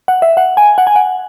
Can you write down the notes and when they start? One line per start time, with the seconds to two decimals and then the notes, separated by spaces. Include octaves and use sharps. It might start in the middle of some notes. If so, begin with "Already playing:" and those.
0.08 F#5
0.22 E5
0.37 F#5
0.57 G#5
0.78 F#5
0.87 G#5
0.96 F#5